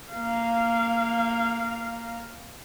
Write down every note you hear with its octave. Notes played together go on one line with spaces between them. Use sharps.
A#3 F5